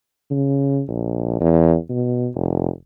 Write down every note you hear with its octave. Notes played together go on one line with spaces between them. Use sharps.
C#3
A#1
E2
B2
F1